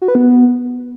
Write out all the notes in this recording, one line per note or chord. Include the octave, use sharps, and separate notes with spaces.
F#4
B4
B3